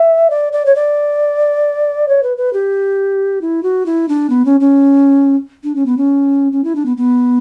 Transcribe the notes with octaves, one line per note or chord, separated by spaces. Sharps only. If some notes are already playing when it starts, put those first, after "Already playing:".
Already playing: E5
D5
D5
C#5
D5
C#5
B4
B4
G4
E4
F#4
E4
D4
B3
C#4
C#4
D4
C#4
B3
C#4
C#4
E4
D4
B3
B3